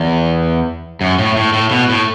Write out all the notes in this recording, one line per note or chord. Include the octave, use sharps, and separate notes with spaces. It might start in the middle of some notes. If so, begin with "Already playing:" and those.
Already playing: E2
F#2
A2
A2
A2
B2
A2